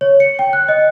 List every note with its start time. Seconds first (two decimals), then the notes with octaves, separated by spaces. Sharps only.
0.01 C#5
0.20 C#7
0.39 G5
0.53 F#6
0.68 D#5